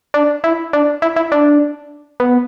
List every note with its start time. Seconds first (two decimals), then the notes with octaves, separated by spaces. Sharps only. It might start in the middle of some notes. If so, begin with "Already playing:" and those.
0.14 D4
0.44 E4
0.73 D4
1.02 E4
1.16 E4
1.32 D4
2.20 B3